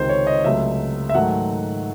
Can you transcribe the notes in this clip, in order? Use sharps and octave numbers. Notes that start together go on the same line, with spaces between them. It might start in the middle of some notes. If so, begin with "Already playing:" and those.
Already playing: C#2 C3 D#3 C5
C#5
D#5
C#2 C3 F#3 A3 E5
E5
G#2 D#3 F#3 A3 F#5